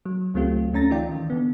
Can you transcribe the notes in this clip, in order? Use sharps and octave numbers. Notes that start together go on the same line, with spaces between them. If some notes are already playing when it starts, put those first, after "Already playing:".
F#3
C#2 F#3 A3 C4 F4 G4
D2 A3 C#4 A#5 A6 A#6
E3 D#4 F4 D5 G5
D#3 E3
D3 B3